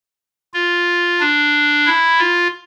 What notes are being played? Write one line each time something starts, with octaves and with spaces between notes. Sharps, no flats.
F4
D4
E4
F4